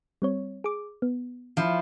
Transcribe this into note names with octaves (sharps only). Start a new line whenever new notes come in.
G3 C4 C#5
G#4 D6
B3
F3 E4